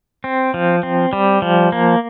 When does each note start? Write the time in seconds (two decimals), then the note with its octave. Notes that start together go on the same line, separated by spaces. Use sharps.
0.24 C4
0.54 F3
0.83 C4
1.13 G3
1.42 F3
1.72 A#3